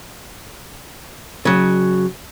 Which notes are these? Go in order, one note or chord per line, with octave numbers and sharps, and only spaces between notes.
C#3 F#3